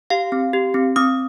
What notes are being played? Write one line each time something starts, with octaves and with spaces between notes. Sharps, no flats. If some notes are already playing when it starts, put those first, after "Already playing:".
G4 F5
C4
G4
C4
C4 D#6